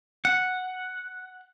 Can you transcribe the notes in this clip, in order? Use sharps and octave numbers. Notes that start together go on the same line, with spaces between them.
F#5